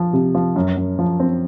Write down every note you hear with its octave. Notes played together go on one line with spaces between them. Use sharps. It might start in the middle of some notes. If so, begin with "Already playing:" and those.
Already playing: F3
C3
F3
F#2
F#2
F3
C4